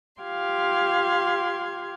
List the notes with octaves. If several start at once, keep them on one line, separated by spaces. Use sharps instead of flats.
F4 G4 F5 C6 G#6